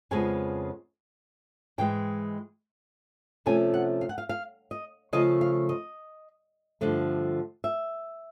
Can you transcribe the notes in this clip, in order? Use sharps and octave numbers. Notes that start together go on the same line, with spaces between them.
F2 C#3 F3 G#3 B3 G#5
G#2 E3 G#3 G5
C3 F3 A3 C#4 G#5
F#5
F5
F#5
F5
F5
D#5
C#3 F3 A3 D#5
F5
D#5
G2 D3 F3 A3
E5